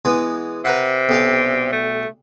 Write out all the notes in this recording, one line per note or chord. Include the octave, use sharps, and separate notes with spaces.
E3 G#3 B3
C3 A#4 B4 F#5
B1 G3 F5
A3